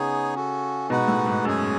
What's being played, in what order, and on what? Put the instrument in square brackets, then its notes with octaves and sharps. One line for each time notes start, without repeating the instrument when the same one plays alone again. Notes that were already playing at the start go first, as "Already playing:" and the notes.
Already playing: [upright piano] C#3 [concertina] B3 D#4 G#4 C#5 G#5
[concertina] C#4 F#4 A4
[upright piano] B2 [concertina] G#3 D#4 F#4 B4 F#5
[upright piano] A2
G#2
[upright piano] F#2 [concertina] G#3 C#4 G#4 C#5 G#5